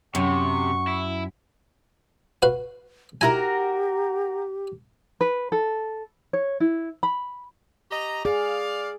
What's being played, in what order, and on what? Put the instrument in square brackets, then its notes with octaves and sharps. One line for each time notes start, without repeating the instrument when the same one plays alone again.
[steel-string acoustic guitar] F#2 [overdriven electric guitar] C3 [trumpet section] F#5 C#6
[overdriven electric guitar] E4
[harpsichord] F#4 B4 F5
[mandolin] D#4 F#4 A#4 [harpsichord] E4 G#5 [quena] G4
[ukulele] B4
A4
C#5
E4
B5
[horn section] G4 D#5 A#5
[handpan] G#4 [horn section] D5 F5